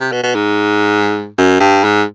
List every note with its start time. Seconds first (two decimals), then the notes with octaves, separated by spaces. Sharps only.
0.01 C3
0.12 B2
0.23 B2
0.35 G#2
1.38 F#2
1.60 G2
1.84 G#2